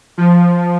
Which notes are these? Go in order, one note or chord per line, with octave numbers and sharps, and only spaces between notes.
F3